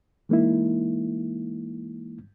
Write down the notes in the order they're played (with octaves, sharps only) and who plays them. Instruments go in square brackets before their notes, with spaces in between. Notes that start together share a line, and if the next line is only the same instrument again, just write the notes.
[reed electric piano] E3 G#3 A#3 D#4 E4